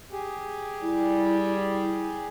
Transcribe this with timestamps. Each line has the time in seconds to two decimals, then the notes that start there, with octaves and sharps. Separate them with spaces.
0.12 G4 G#4
0.82 G3 E4